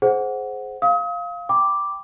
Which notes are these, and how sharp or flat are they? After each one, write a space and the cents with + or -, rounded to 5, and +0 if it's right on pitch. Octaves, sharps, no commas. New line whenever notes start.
G#4 +20 C5 +0 F#5 +0
F5 +0 D#6 +40
G5 +0 B5 +0 D6 +0